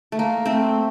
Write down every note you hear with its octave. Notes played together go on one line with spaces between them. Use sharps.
A3
A#3
A3 C4